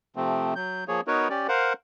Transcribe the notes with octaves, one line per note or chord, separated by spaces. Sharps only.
C3 F3 A3 C4
F#3 G6
F3 A#3 G#4 C#5
B3 D#4 F#4 A#4 B4 C#5
C#4 G4 D5
A#4 C5 F5 F#5